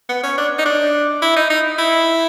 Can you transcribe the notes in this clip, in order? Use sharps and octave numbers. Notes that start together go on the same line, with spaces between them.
B3
C#4
D4
D#4
D4
E4
D#4
D#4
E4